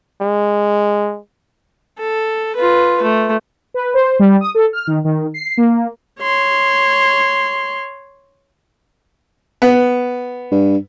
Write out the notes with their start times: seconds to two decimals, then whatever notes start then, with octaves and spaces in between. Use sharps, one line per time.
0.21 G#3
1.99 A4
2.56 F4 B4
3.02 A3
3.74 B4
3.94 C5
4.19 G3
4.41 D#6
4.55 A4
4.73 F6
4.87 D#3
5.05 D#3
5.34 C7
5.57 A#3
6.22 C#5 C6
9.62 B3
10.51 G2